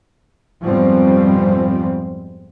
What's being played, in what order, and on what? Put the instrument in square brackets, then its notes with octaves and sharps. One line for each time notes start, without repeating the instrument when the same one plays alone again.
[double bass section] F2 G#2 B2 F3 G3 C4